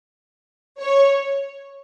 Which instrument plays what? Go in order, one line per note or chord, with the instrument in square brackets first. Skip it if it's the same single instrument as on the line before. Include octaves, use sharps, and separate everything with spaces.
[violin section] C#5